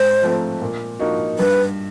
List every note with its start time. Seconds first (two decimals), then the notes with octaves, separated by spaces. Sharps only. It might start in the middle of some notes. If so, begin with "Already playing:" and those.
Already playing: G#2 C5
0.22 F3 A3 C4
0.61 A#2
0.99 F3 A#3 D#4 F#4
1.39 G2 B4